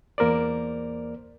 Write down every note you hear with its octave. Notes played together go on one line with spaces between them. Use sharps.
E2 A#3 A#4 C5 D5